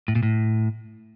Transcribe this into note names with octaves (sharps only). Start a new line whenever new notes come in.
A2
A#2
A2